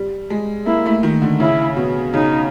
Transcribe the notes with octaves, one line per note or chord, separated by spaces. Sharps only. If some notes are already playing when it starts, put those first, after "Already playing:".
Already playing: G3
G#3
A#3 E4
A3
D#3
D3
C#3 E4
B2
C#3 D#4